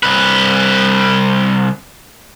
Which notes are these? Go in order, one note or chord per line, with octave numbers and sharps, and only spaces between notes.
C2 B4